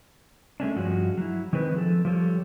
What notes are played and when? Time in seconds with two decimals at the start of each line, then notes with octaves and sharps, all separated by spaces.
0.60 G#3 A3 C#4 D4
0.76 G2 F3 G#3 F#4
1.18 F#3 E4
1.53 D#3 G#3 C4 B4
1.74 F3 A4
2.05 F3 G3 A4 C#5